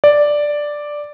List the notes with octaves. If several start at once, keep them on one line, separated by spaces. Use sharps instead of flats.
D5